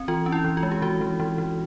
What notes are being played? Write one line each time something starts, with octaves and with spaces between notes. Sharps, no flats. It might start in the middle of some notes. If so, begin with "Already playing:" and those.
Already playing: C4
E3 F4
C#4
E4
E3
F4
G#3
G4
E3 F#4
E3
E3
E3